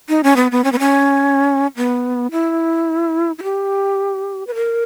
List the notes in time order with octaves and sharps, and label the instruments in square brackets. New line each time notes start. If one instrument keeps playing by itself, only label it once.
[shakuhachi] D#4
C#4
B3
B3
C#4
B3
C#4
B3
E4
E4
G4
B4
A#4